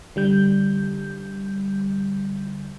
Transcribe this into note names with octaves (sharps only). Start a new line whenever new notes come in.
D3 G3 G6